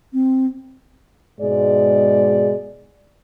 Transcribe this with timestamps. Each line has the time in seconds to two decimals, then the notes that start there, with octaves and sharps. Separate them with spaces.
0.13 C4
1.41 G#2 B2 G#3 D5